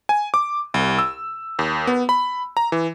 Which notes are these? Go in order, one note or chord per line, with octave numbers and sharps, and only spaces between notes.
G#5
D6
C2
E6
D#2
B3
B5
A#5
E3